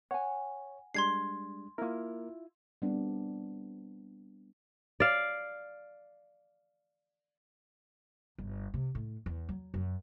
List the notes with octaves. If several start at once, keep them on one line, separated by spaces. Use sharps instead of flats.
C#5 F#5 G#5
G3 G#3 D4 C6 G#6 C7
A#3 E4 F4 A#4
G3 B3 C4 D4
D5 F5
G1
C3
A2
E2
F#3
F#2